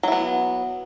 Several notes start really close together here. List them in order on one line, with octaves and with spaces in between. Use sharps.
F#3 E4 B3